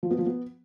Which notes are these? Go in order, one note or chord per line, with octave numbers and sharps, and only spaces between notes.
F3
B3
F3
B3